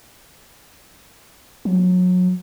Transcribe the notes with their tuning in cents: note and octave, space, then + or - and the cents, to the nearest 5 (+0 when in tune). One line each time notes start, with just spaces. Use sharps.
F#3 -30